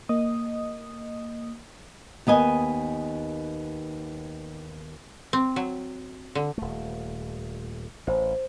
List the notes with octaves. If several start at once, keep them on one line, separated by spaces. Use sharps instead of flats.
A#3 D#5 D#6
D#2 B3 D#5 G#5
C4
F#3
D3
D#1 A3
A1 C5